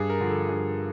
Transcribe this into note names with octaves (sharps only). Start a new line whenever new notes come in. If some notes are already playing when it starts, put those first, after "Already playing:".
Already playing: G2 G#4
A#4
D3 F3
A4
G2 G#4